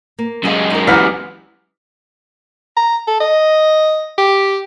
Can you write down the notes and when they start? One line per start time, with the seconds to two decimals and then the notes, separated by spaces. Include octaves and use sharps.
0.19 A#3
0.44 F#2 G3 G#3 G#4 F5
0.70 D#4 A#4
0.87 E3 B3 G4 F5 F#5 A#5 F6 B6
2.77 A#5
3.07 A4
3.20 D#5
4.18 G4